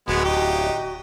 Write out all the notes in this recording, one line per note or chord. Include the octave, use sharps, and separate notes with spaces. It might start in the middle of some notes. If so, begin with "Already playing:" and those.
D1 G#3 B3 F#4
D#4 G4